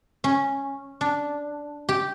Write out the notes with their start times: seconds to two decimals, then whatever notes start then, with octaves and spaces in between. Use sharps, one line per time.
0.24 C#4
1.01 D4
1.89 G4